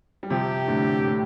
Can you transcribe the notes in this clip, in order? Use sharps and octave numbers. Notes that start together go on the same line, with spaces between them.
G3
C3 F3 G4
A2 D3
A2